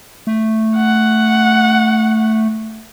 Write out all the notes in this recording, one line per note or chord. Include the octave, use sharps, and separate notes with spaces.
A3
F#5